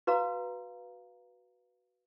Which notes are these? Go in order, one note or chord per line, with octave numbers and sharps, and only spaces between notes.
F#4 B4 F5 A#5